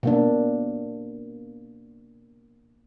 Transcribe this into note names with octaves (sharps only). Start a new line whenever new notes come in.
B2 A#3 D4